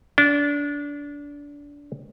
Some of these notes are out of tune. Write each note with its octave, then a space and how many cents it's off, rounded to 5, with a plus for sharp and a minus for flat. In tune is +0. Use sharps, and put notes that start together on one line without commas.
D4 -25